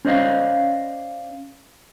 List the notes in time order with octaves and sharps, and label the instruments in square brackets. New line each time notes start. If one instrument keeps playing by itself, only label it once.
[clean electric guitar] C#4 C5 D5 D#5 F5